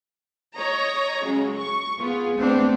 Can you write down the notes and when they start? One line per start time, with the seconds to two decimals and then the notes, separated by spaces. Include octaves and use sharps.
0.55 C#5 D#5 A#5
1.25 C#3 F#3 G#3
1.56 C#6
1.99 B3 F4 G#4
2.38 A3 B3 C4 D4